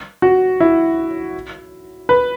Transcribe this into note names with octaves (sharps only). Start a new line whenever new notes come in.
F#4
E4
B4